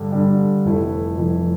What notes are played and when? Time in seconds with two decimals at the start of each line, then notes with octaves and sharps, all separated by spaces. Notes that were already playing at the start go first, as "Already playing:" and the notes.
Already playing: G2 D3 G3
0.12 G2 D3 G3
0.64 F1 F2 E3 A3 E4
1.17 F1 F2 E3 A3 E4